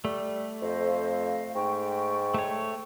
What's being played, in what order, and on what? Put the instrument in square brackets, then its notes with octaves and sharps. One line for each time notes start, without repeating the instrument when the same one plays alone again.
[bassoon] G3 [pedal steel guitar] A3
[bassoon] F2 [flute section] C5 D#5 F5
[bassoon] G#2 [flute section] G5 C#6
[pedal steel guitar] A3 C#5